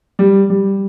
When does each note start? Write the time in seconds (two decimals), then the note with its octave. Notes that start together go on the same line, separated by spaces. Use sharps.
0.19 G3
0.50 G3